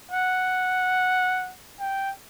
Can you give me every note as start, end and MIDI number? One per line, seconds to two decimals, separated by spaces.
0.11 1.53 78
1.81 2.11 79